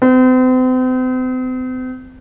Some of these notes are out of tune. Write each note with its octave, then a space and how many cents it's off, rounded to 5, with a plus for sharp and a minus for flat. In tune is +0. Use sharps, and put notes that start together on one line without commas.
C4 -40